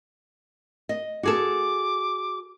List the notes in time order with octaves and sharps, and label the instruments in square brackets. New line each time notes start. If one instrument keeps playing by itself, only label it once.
[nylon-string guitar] D#5
[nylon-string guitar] F#4 G#4 A4 [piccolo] D6